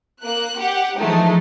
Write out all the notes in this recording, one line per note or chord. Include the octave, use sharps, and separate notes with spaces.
A#3 F#6
G4 F#5
E3 F3 G#3 A3 D#4